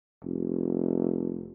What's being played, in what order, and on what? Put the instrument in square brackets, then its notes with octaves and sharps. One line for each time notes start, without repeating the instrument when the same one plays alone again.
[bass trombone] F1